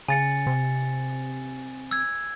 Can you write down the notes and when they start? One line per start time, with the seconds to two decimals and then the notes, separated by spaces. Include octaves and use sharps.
0.08 C#3 G#5 A6 C#7
0.47 C3
1.91 E6 G#6